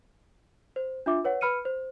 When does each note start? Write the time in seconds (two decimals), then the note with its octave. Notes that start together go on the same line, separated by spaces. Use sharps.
0.76 C5
1.06 D4 F4 E5 D6
1.24 B4 C#5 F#5
1.41 B4 B5 F6 C#7 D#7
1.65 C5